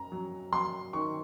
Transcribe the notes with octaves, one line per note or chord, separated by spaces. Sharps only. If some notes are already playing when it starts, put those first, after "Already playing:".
Already playing: F#2 A#5
F#3
F#3 C6
D#3 C#6